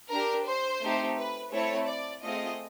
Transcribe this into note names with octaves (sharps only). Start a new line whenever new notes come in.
D4 G4 A#4
C5
A3 C4 D#4 G4
B4
A3 C4 E4 A4 C#5
D5
A3 C4 F4 G#4 D#5